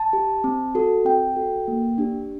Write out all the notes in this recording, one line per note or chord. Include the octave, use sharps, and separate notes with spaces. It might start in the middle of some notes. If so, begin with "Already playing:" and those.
Already playing: A5
G4
C4
F#4 A4
C4 G5
F#4 A4
A#3
D4 G4